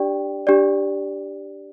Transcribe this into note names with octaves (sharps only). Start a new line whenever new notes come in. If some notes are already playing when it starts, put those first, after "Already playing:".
Already playing: D4 G4 D5 G5
D4 G4 D5